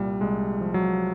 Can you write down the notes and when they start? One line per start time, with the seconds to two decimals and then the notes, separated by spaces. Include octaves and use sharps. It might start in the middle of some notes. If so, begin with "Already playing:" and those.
Already playing: C2 A#2 G3
0.21 C2 G#3
0.60 F3
0.74 F#3